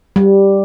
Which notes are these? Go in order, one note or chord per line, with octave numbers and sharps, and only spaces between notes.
G3